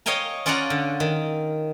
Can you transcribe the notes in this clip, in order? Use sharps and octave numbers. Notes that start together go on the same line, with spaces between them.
C#5 D#5 F5 G5 G#5 A#5
C#4 F4 D5 F#5 G#5 A#5
D3
D#3